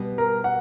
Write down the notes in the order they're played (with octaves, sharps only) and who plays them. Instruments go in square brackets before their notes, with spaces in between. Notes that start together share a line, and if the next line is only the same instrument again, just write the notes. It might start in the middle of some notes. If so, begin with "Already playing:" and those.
Already playing: [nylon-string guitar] B2 G3 B3
[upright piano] A#4
F#5